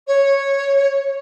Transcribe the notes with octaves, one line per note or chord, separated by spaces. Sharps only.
C#5